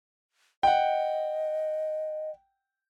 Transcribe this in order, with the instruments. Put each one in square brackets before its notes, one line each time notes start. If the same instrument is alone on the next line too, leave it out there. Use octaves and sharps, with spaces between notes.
[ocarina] D#5 [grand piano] F#5 G5